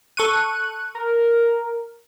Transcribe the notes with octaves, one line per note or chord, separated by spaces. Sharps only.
A4 C#6 F#6 D#7
A#4